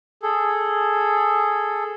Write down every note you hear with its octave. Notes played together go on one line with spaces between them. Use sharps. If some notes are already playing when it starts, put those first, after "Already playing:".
G#4 A4